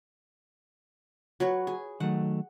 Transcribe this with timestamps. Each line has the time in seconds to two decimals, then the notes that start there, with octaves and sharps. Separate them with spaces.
1.40 F#3 B4 C#5
1.67 G#4
2.00 D#3 F#3 A3 F#5